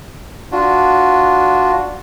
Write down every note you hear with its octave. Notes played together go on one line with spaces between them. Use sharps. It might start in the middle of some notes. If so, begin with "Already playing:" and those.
D4 F4 F#4